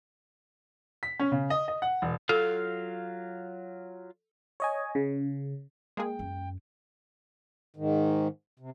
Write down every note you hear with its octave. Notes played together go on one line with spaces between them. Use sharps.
B6
C#4
C#3
D#5
D#5
F#5
E1
F#3 F4 A4 F5
C#5 D#5 G#5
C#3
G#3 A#3 G#4 G5
F#2
G#2 D#3
C3